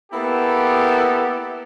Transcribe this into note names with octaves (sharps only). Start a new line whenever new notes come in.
A#3 B3 E4 G4 A4